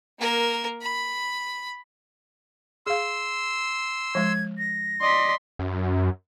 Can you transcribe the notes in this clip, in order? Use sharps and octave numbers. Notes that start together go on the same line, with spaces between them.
A#3 A#4
B5
G#4 F5 C6 E6
F3 G#3 G#6
A#6
D5 D#5 C6 B6
F#2